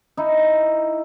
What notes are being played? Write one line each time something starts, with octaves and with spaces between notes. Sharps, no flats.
D#4 E4